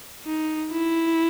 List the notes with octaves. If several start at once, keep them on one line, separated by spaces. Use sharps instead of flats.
D#4
E4